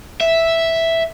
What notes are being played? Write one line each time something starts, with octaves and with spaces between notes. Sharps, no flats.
E5